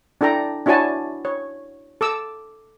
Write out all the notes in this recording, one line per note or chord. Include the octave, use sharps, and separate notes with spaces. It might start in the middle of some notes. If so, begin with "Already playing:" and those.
D4 E4 A4 G5 A#5
D4 E4 F#4 C#5 G#5 A5
C#5
A4 D6 E6